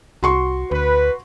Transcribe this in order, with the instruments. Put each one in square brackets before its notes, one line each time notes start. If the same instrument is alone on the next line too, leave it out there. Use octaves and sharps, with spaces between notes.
[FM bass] C2 [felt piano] F#4 C6 C#6
[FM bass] D2 [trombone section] B4